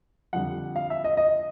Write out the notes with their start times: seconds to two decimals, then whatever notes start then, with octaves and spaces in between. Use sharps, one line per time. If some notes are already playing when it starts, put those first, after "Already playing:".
0.33 F2 D3 G3 F#5
0.76 F5
0.90 E5
1.04 D#5
1.17 D#5